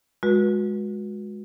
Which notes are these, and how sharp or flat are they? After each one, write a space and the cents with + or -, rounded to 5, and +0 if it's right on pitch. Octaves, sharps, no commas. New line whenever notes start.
G#3 +0 F#4 -30 B4 -35